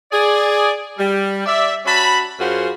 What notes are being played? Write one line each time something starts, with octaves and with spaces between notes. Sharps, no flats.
G#4 D5
G3
D5 E5
C#4 F#4 A5 B5
F#2 F4 F#4 G#4 C5 F#5